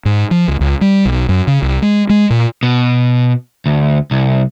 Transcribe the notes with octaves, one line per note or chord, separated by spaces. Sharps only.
G#2
F3
C#2
C#2
G3
B1
F#2
C#3
C2
G#3
G#3
A#2
B2
D2
C2